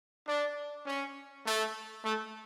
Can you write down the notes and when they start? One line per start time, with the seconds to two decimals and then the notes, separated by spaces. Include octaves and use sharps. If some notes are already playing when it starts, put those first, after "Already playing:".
0.28 D4
0.87 C#4
1.46 A3
2.05 A3